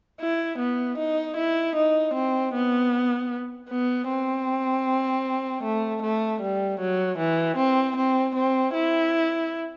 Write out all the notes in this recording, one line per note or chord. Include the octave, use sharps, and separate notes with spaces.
E4
B3
D#4
E4
D#4
C4
B3
B3
C4
A3
A3
G3
F#3
E3
C4
C4
C4
E4